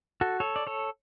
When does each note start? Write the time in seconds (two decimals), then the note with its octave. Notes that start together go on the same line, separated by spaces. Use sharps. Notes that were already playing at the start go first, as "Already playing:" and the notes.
0.21 F#4 A4
0.40 A4 C#5
0.56 D5
0.67 A4 C#5